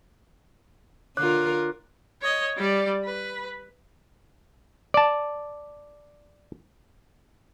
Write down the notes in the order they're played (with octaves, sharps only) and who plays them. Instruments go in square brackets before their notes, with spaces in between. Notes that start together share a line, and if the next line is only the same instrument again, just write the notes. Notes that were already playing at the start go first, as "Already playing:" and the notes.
[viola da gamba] D3 F4 A#4 [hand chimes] C#5 D6 F#6
[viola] C#5 D#5
G3 D5
B4
[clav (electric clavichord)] D5 A5